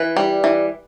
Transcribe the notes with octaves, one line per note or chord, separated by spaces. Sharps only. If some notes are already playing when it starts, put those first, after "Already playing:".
Already playing: E3 B4
G3
E3